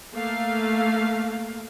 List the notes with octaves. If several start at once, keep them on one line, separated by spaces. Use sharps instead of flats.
A3 A#3 F5